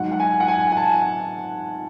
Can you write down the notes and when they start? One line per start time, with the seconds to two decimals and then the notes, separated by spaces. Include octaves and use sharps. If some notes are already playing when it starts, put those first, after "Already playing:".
Already playing: G#2 F#3 F#5
0.12 F#5
0.20 G#5
0.40 F#5
0.48 G#5
0.72 G#5
0.77 A5